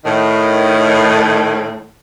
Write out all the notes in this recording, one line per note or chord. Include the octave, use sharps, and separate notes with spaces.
A2 D#3